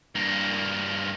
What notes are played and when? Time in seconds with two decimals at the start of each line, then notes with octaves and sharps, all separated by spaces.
0.15 G2 A#3